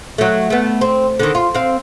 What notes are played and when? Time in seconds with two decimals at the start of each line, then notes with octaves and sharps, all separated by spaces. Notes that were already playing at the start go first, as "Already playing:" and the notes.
0.18 F#3 A3
0.50 A3 B3
0.81 C4
1.19 D3 D#3
1.35 F4
1.55 C4 F5